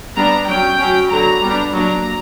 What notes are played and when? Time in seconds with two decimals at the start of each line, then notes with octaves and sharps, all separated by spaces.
0.16 G3 B3 D4 A#5
0.47 F#3 C#4 G5
0.78 F#3 C#4
1.10 D3 F#3 B3 A#5
1.42 G3 B3 D4
1.73 F#3 A#3 D4 A#5